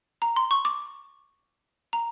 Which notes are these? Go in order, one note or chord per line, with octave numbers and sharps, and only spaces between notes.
A#5
C6
C#6
D6
A#5